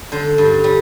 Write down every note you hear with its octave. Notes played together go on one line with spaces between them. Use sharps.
D3 C5
G2
G3